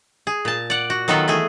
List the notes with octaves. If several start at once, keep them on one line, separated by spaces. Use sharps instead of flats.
G#4
A#2 A5
D5 F#5
F#4
D#3 F#3 B3 F4 A4 B4
E3 A3 G#4